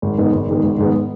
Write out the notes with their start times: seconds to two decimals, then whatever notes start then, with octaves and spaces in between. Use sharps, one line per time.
0.02 G#1
0.18 G#2 D#3 B3
0.33 G#1
0.49 G#2 D#3 B3
0.63 G#1
0.78 G#2 D#3 B3